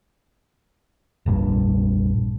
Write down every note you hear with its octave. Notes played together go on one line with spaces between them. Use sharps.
F1 A#1 G2